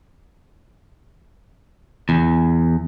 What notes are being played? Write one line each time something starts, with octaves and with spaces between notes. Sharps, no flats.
E2